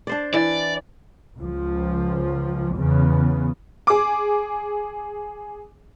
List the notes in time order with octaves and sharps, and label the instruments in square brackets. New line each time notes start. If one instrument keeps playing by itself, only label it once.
[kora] D4 C5 D5
[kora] E3 [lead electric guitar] D5
[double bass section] C#2 F3
E2 C#3 B3
[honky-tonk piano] G#4 D6